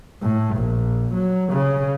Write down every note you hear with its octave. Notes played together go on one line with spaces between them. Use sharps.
A2
A#1
F#3
C#3